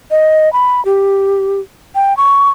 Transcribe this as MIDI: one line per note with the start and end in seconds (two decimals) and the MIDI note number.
0.11 0.52 75
0.53 0.83 83
0.85 1.60 67
1.95 2.16 79
2.17 2.51 85